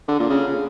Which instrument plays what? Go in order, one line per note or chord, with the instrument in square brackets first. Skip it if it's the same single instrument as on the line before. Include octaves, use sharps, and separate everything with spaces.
[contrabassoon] D3
A#2
C#3